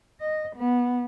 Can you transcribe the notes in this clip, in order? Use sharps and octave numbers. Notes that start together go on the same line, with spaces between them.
D#5
B3